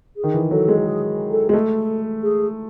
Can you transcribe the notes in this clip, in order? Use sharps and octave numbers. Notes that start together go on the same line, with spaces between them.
G#4
D#3
E3
F#3 A4
G#3
G#4
A4
G#3
A3 A4
G#4